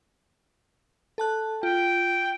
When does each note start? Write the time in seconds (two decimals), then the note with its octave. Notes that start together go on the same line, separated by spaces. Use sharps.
1.18 A4 A5 F#6
1.63 F4 G5